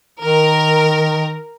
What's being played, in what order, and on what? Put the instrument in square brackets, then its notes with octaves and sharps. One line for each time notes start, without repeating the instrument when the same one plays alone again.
[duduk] D#3 [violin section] A#4